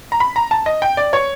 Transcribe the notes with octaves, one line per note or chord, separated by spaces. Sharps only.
A#5
B5
A#5
A5
D#5
G5
D5
C#5